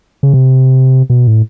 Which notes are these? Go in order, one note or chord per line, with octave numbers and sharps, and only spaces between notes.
C#3
C3
B2
A2